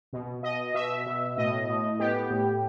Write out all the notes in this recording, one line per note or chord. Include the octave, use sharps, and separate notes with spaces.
B2
B2 D#5
B2 E5
B2
A2 D#5
A2
B3 G4
A2